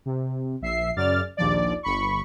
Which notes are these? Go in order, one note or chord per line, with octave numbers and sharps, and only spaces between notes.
C3
A#1 E5 C7
F#2 C#3 D5 F6 A6
A#1 D#2 F3 D5
G1 B5 C#6